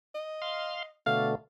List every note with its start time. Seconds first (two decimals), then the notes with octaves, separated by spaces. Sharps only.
0.15 D#5
0.42 F5 C6
1.06 B2 D3 A3 F5